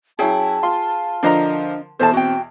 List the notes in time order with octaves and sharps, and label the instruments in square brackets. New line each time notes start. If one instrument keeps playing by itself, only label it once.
[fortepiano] F#3 C#4 E4 [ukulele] G#4 G5 [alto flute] A5
[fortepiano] F4 C6
[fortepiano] D3 F3 A#4 [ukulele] D4 D#5 A#5
[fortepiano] E2 B2 [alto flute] A4 [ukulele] C5 A5
[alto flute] C4 [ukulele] F#4 G5